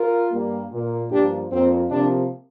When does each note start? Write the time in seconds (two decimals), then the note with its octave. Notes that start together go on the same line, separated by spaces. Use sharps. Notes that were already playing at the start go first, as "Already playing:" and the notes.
Already playing: F4 A#4
0.31 G2 G3 A#3
0.71 A#2 A#3
1.10 G2 F3 A#3 D4 G4
1.50 F2 F3 A#3 C4
1.90 C3 F3 A#3 D4